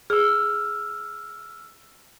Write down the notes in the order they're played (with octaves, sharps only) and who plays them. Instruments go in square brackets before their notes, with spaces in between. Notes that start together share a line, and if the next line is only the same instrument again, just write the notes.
[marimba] G#4 [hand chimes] E6 F6